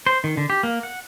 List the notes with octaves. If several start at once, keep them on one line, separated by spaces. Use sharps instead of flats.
C5
D#3
D3
G4
A#3
F#5